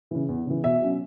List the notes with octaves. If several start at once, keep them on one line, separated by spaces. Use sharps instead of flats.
C#3 E3
E2
C#3 E3
B2 E5
F#3 C#4